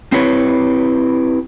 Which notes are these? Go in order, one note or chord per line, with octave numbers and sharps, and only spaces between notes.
C4 E4 G4 B4 C#5